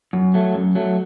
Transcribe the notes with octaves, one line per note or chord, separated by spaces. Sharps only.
F#2
F#3 A3
F#2
F#3 A3